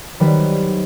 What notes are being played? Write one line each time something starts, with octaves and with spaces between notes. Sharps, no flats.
D#3 F#3 G3 B4 C5